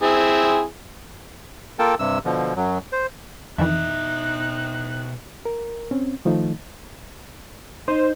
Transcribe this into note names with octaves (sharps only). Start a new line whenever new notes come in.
C4 E4 G#4
A#3 F4 A4 A#4 G5 A5
G2 C3 E6
B2 D3 F3
F#2 F#3
C5
F2 B2 D#3 E3 D#4 E5 F#6
A#4
C4 C#4
D#3 F3 A3 D#4
D#4 C5